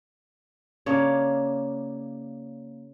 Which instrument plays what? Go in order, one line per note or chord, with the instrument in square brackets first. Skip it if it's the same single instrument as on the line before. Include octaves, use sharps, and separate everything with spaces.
[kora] C#3 A#3 D4 C#5